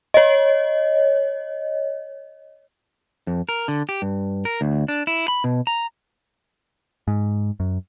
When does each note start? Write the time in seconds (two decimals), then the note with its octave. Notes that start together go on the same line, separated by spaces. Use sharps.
0.14 C#5 D#5
3.27 F2
3.49 A#4
3.68 D3
3.89 G4
4.02 G2
4.45 A#4
4.61 D2
4.88 D4
5.07 E4
5.28 B5
5.44 B2
5.67 A#5
7.08 G#2
7.60 F#2